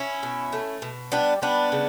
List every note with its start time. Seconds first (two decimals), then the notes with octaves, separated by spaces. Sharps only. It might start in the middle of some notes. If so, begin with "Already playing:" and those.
Already playing: C#4 E4
0.23 B2
0.53 A3
0.82 B2
1.12 G3 B3 D4
1.42 G3 B3 D4
1.72 C#3